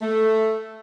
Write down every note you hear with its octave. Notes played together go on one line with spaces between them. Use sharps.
A3